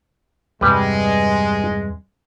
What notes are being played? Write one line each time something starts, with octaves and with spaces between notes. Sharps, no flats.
E2 G2 C3 G3 G#3 B4